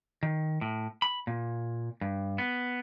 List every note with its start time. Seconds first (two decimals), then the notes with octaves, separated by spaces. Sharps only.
0.23 D#3
0.61 A2
1.02 B5
1.27 A#2
2.01 G2
2.38 B3